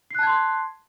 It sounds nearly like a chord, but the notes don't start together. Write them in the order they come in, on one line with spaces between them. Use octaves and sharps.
C7 F#6 A5 G#6 C6